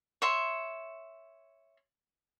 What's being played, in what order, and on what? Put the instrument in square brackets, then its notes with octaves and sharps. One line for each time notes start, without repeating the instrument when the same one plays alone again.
[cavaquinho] C#5 E5 C6